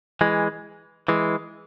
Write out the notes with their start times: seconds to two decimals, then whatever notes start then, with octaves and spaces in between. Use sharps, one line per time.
0.21 E3 G#3
1.08 E3 G#3